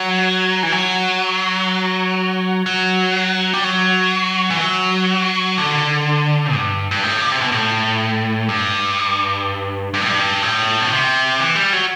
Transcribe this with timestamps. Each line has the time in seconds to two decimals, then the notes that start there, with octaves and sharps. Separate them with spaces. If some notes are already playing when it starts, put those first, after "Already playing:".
Already playing: F#3
0.63 E3
0.72 F#3
2.66 F#3
3.54 G3
3.64 F#3
4.50 E3
4.61 F#3
5.58 D3
6.54 G2
6.91 G2
7.04 A2
7.21 D3
7.32 C3
7.41 B2
7.52 A2
8.49 G2
9.94 G2
10.02 A2
10.09 G2
10.42 A2
10.80 B2
10.91 C3
11.40 E3
11.56 G3
11.73 F#3